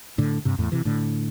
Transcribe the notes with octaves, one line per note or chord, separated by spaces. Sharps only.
A2 D3
G2 C3
E2 A2
C3 E3
A2 D3